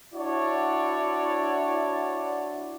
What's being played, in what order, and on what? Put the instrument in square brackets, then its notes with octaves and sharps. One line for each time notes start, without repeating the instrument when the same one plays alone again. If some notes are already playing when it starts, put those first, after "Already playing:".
[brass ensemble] D4 E4 F#4 C#5 D5